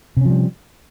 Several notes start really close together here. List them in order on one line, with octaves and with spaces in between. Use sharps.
C3 C#4 F3 G3